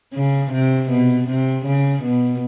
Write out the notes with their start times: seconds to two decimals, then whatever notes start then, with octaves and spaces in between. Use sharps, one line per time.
0.14 C#3
0.52 C3
0.90 B2
1.28 C3
1.66 C#3
2.03 B2